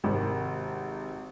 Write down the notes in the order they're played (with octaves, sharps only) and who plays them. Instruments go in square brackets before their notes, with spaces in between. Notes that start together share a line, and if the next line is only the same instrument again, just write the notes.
[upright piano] G#1 C3 A#4